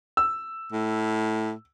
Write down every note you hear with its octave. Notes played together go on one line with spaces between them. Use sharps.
E6
A2